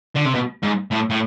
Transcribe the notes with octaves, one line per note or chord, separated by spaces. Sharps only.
D3
C3
B2
G#2
A2
A2